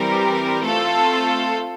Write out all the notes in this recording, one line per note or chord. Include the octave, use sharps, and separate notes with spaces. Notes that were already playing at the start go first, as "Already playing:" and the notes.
Already playing: E3 G3 C4 G4 A#4
A3 C4 F4 A4